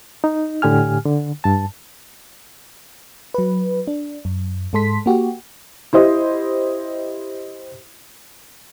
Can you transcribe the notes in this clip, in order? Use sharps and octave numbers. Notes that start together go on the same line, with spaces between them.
D#4
A2 D3 G4 G#5 F6
D3
G2 A5
F#3 B4
D4
F#2
G#2 G#3 A4 C6 B6
A#3 F#4 G4
E4 G4 C5 D#5